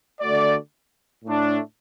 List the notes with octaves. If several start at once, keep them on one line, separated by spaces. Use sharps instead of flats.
D3 A3 F#4 D5
A2 A3 D4